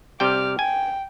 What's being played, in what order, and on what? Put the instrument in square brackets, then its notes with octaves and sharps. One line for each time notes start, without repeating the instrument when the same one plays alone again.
[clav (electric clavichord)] C3 G3 G5 [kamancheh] D6 F6
[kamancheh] G5 [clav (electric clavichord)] G#5